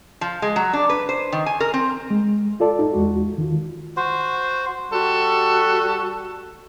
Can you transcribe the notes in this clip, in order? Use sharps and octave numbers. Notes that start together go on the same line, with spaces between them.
F3
G#3
F#3
D4
B4
C5
D#3
G#5
A#4
C4
G#3
F4 A4 D5 A5
D#4
E2 G#3 F#4
D#3 F4
F#4 C5
G3 F#4 A4